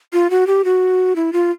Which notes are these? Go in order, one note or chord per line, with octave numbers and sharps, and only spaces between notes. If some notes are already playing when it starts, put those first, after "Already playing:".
F4
F#4
G4
F#4
E4
F4